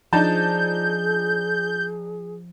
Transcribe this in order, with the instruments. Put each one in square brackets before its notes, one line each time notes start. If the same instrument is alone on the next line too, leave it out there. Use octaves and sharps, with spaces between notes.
[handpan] F3 [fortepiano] D4 D#4 A5 [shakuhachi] G#4 [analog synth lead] G6